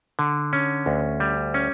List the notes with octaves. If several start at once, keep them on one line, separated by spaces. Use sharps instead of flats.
D3
C#4
D2
G3
C#4